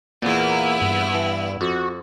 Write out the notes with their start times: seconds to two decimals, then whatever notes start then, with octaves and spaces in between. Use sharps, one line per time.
0.22 E2 A#2 A#3 B3 E4
0.82 G2
1.15 E3
1.61 F2 F#4